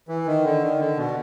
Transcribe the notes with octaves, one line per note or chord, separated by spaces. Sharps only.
E3
D#3
D3
D#3
D3
B2